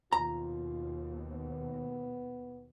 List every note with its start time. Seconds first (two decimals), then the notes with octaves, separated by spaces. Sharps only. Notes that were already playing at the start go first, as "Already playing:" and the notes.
0.13 D#2 B2 F4 A#5
1.32 B3